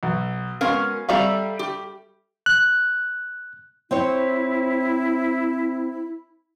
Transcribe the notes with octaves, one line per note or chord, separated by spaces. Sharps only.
B1
G#3 B3 C#4 F#4 A#4 F5
G3 A4 D5 E5 F5 A#5
G4
F#6
C4 E4 C5 C#5